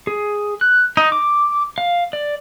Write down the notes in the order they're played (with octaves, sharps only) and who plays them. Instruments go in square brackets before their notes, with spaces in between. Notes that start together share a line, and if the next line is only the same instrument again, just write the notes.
[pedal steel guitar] G#4
F#6
D#4
D6
F5
D5